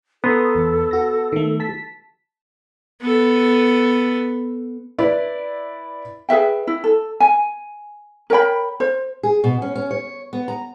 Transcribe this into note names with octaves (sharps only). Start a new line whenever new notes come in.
B3 A4 A#5 C6 D#6
E2
F#4 A#6
D#3 A3
A5 B6
B3 A4
E4 B4 D5
G#4 B4 E5 G5
E4
A4
G#5
A#4 C#5 G5 B5
C5
G#4
B2
C#4
C#4
C#5
B3
A#5